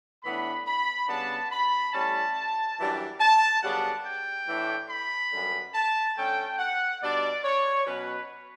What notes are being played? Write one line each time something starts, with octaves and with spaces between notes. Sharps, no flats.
A2 E3 B3 D4 B5
B5
C#3 G3 B3 D4 A5
B5
A2 G3 C#4 A5
F#2 E3 G3 D4
A5
F#2 C#3 G3 B3 D4 F#5
G5
A2 E3 A3 D4
B5
F#2 D3 G3 B3
A5
D3 A3 C#4 G5
F#5
B2 G3 D4 D5
C#5
B2 F#3 C#4 B4